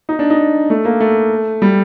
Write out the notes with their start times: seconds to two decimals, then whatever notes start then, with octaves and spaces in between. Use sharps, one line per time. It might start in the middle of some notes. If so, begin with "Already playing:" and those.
0.09 D#4
0.19 D4
0.30 D#4
0.70 A3
0.85 A#3
1.00 A3
1.62 G3